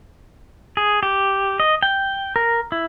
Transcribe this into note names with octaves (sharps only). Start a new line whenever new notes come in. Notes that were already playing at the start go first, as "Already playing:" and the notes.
G#4
G4
D#5
G5
A#4
E4